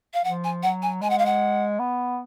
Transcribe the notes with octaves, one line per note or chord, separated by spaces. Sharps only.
F5
F3 F#5
G#5
F#3 F#5
G#5
G#3 G#5
F#5
F5
F#5
B3